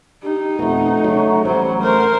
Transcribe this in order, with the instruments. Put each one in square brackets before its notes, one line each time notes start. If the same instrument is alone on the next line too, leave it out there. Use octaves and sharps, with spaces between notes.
[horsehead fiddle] D#4 [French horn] G4
[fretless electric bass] F2 B2 [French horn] A3 [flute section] F#5 A#5 C#6
[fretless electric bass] C#3 F#3
[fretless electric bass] A1 [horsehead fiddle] F#3 G3 [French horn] C5
[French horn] A3 [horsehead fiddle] A#4 C5